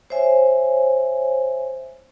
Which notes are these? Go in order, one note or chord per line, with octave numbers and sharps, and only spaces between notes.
C5 C#5 E5 G#5